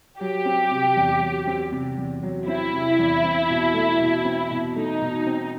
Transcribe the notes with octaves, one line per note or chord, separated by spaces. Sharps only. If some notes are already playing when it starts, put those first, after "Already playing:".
F#3 G4
C4
C3
E2
F#3
C4
C3
E2
F#3
C4 E4
C3
E2
C4
B2
A3
B2
C4
B2
A3 D#4
B2
C4